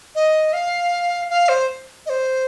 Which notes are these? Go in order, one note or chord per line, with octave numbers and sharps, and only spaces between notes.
D#5
F5
F5
C5
D#5
C5